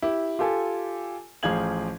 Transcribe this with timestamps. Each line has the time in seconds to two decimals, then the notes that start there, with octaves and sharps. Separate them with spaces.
0.02 E4 G4
0.39 F4 G4 A4 G#5
1.43 A1 F3 G#4 F5 G#6 F#7